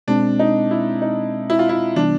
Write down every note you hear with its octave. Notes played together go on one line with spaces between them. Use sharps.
B2 G#3 C4 D4
D#4
E4
D#4
E4
F4
E4
C3 E3 G3 B3 D4